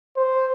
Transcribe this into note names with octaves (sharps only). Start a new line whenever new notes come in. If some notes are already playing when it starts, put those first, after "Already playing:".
C5